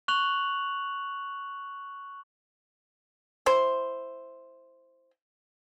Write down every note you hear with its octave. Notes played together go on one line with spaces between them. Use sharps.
C#6 F#6 F7 F#7
E4 C5